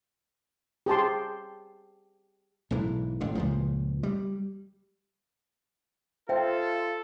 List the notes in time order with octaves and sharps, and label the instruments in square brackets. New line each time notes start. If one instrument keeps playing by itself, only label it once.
[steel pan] G4 G#4 A5 C6
[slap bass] B1 G#2 E3
A1 D3
C#2 A#2 F3
G3
[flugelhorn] F4 [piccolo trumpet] A4 [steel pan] C5 [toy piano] E5 G5